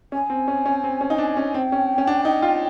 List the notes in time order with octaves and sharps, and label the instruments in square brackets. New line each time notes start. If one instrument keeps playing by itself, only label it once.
[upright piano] C#4 [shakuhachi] G#5
[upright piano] C4
C#4
C#4
C4
C#4
D#4
D4
C#4
[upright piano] C4 [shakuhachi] G5
[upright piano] C#4
C#4
D4
D#4
F4